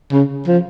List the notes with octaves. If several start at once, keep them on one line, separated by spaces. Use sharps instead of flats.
C#3
F3